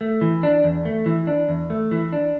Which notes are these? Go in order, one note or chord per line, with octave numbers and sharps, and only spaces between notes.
A3
E3
D4
E2
A3
E3
D4
E2
A3
E3
D4